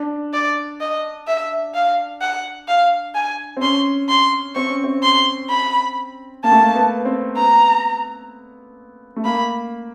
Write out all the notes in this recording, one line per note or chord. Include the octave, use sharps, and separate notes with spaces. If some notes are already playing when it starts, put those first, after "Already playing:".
Already playing: D4
D5
D#5
E5
F5
F#5
F5
G#5
C4
C#4 C6
C6
C4 C#6
C#4
C4
C6
B5
A#3 A5
A3
A#3
B3
C4
B3 A#5
A3
A#3 B5